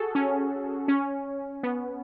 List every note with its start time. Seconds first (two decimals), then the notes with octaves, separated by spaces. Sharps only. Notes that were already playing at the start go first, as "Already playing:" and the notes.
Already playing: F#4 G#4 A4
0.15 C#4
0.88 C#4
1.63 B3